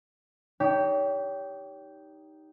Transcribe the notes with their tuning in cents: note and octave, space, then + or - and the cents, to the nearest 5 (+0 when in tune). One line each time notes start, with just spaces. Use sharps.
D#4 +0 G4 -5 C#5 +35